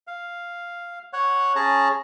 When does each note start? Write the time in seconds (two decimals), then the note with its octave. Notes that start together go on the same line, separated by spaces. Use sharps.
0.07 F5
1.13 C#5 F#5
1.56 C#4 G#4 A5 A#5